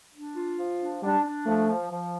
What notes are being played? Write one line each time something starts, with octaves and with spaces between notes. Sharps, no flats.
D4
F4
F3
D4
G3 D4
D4
F3 A3
F3
F3